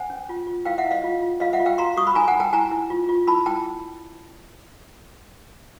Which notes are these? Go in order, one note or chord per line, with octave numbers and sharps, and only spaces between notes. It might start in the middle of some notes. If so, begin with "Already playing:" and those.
Already playing: C5 F#5 G#5
C#4
F4
F4
E4 F5 G5
E5 F#5
E4
D#5 F5
F4
F4
F4 D#5 F5
E5 F#5
F4
F5 G5
F#4 A#5 C6
F#4 C#6 D#6
B5
D#4 G#5 A#5
F#5 G#5
D#4
G5 A5
E4 G#5 A#5
E4
F4
F4
E4 A5 B5
E4 G5 A5